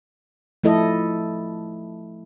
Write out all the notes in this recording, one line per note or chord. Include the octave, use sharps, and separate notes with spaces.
F3 A3 E4 A4 D#5